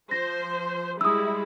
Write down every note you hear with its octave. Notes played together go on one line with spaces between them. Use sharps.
F3 C5 A#6
G3 G#3 E4 D#6 E6